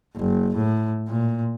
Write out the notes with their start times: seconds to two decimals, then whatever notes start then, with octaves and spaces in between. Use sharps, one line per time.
0.16 F#1
0.55 A2
1.08 A#2